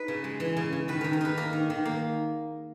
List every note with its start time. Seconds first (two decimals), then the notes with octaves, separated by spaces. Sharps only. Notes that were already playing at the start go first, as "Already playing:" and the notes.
Already playing: D#4 B4
0.08 C#3
0.24 G#3
0.40 E3
0.57 C#3
0.73 C#3
0.88 D#3 B4
1.01 D#3 A#4
1.13 A#4
1.21 D#4 B4
1.37 A#3 A#4
1.53 D#3
1.70 D#3
1.85 A#3